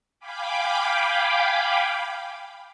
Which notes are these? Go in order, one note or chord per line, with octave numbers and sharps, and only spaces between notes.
F5 G5 G#5 B5 D6